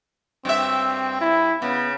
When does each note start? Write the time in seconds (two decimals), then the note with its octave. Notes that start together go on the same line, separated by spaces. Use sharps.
0.45 G2 C4 F#4 E5
1.21 E4
1.62 C#3 B3